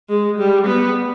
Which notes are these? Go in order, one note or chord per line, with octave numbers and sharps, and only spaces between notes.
G#3
G3
B3